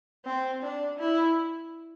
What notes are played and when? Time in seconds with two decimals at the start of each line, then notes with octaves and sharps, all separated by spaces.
0.26 C4
0.63 D4
0.99 E4